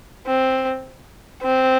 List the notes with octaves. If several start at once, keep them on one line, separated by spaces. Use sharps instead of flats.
C4
C4